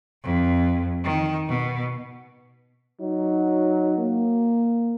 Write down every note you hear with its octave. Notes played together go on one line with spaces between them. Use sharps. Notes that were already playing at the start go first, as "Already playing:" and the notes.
F2
D#3
B2
F#3 D#4
A#3